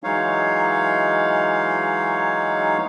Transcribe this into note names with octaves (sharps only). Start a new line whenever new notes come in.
E3 F#3 G#3 D#4 C#5 F5